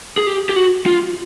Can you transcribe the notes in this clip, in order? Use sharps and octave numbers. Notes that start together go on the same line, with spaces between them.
G#4
G4
G4
F#4
F4